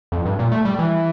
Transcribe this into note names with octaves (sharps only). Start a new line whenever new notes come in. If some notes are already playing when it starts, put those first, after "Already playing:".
F2
G2
A#2
A3
G3
E3